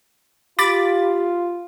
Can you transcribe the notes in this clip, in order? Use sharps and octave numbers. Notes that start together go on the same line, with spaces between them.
F4 G4 B5 D6 A6